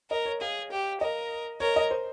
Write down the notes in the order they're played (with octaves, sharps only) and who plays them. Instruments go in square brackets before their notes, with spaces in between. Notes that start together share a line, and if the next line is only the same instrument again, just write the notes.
[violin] A#4 [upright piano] D#5
[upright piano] C#5
[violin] G#4 [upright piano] F5
[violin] G4
[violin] A#4 [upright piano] D#5
[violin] A#4 [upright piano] C#5
[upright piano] D#5
C5